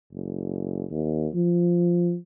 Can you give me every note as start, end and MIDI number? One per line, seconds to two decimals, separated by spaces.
0.12 0.84 30
0.91 1.28 39
1.34 2.15 53